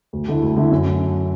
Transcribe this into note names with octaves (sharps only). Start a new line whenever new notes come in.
D2
D3 A3 E4
D2
D3 A3 E4
F#2